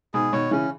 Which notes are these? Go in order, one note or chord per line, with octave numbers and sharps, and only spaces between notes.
G#2 B2 G#4
B2 D#3 C#5
C#3 E3 C#4